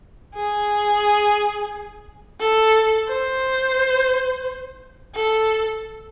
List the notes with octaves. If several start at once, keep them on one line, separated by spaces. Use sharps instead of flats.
G#4
A4
C5
A4